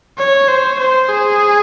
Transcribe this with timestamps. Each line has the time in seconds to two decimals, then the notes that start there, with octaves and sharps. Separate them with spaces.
0.18 C#5
0.48 C5
0.79 C5
1.09 G#4